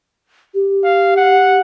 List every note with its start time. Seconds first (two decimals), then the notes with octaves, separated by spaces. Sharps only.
0.54 G4
0.84 F5
1.17 F#5